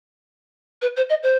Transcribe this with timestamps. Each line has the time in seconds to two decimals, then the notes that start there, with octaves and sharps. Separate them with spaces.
0.82 B4
0.96 C5
1.10 D#5
1.23 C5